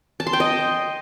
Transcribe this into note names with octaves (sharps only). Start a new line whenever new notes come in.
A5
C6
G5
D#5